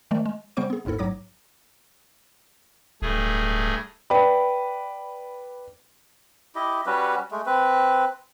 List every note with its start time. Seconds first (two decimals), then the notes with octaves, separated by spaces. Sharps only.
0.11 D#3 F3 G#3 A3 D5
0.26 G#3
0.57 C#3 G3 B3 C5 C#6 D7
0.70 B3 G#4
0.85 G1 D#2 G#2 E4 A4
0.99 A1 G#2 F#3 C#5 D6 A#6
3.02 D1 G2 A3 G#4
4.10 B4 D5 G5 B5
6.55 E4 G4 D#5
6.86 G3 C#4 F#4 B4
7.31 G#3 A3
7.46 C4 B4